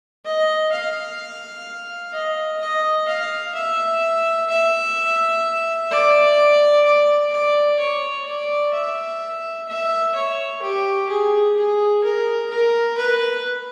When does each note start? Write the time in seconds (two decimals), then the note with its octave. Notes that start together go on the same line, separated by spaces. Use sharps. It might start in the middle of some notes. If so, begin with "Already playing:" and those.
0.25 D#5
0.72 F5
2.13 D#5
2.60 D#5
3.08 F5
3.54 E5
4.49 E5
5.91 D5
6.85 D5
7.32 D5
7.79 C#5
8.26 D5
8.73 E5
9.68 E5
10.15 C#5
10.62 G4
11.09 G#4
11.56 G#4
12.03 A#4
12.50 A#4
12.97 B4